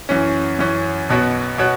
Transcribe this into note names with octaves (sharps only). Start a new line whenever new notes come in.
F#2 E3 C#4
F#2 E3 C#4
B1 B2 B3 F#4 C#5
B2 B3 F#4 C#5